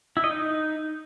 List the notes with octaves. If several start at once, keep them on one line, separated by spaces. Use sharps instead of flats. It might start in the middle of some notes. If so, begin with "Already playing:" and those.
E4
D#5
D#4